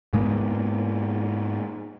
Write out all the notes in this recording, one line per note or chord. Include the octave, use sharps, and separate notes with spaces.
G#2 G#3 A#3 B3